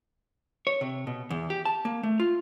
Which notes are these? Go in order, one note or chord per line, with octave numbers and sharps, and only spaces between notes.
C#5
C3
B2
E2
G4
A5
A#3
A3
F4